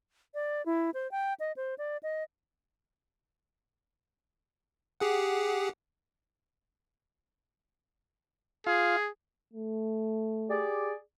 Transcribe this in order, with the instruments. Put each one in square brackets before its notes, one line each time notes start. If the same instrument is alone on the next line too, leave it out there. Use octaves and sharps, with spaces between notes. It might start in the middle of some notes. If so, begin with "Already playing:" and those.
[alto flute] D5
E4
C5
G5
D#5
C5
D5
D#5
[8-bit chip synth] G4 G#4 F#5
[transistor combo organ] F4 F5 [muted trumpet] G#4
[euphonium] A3
[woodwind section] G4 G#4 D5